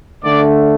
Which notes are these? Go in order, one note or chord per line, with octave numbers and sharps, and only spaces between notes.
D3 A3 D5